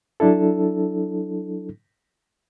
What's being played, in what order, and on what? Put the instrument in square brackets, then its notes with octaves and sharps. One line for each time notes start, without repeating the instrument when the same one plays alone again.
[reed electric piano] F#3 D4 E4 A4